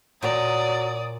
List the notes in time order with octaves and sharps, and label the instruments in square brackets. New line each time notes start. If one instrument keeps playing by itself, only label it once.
[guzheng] A#2 A#5 [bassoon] F#3 [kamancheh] D5 D#6